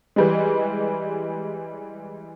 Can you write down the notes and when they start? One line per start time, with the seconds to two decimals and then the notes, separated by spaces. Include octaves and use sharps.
0.16 E3 G3 G#3